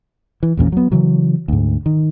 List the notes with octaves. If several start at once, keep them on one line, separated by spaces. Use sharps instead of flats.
E3
A1 E2 A#2 C#4
F#3 B3
C#3 E3 F#3
D2 G#2
D#3